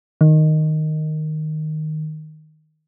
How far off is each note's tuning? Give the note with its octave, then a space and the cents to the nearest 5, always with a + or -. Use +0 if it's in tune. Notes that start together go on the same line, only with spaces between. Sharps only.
D#3 -5